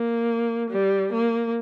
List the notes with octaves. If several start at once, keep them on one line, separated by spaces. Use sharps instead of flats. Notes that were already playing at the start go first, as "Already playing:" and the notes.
Already playing: A#3
G3
A#3